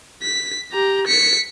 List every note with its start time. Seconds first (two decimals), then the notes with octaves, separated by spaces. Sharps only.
0.23 B6
0.72 G4 A#5
1.07 B6 C#7